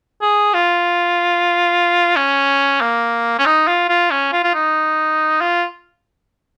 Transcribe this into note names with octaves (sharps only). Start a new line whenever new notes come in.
G#4
F4
C#4
A#3
C#4
D#4
F4
F4
C#4
F4
F4
D#4
F4